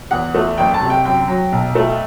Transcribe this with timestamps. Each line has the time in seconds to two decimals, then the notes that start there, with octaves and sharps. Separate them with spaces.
0.11 E2 F#5
0.34 A3
0.58 F#1 G5
0.74 A5
0.81 C3
0.90 G5
1.05 F#2 G5
1.28 F#3
1.52 B1
1.75 A3